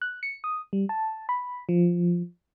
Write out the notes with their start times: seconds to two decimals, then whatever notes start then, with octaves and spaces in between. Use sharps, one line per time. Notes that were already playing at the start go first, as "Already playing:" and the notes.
0.02 F#6
0.23 C#7
0.44 D#6
0.73 G3
0.89 A5
1.29 B5
1.69 F3